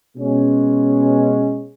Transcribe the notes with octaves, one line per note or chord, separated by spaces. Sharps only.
B2 G#3 C#4